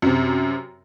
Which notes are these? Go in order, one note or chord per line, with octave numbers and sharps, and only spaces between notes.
F#2 C3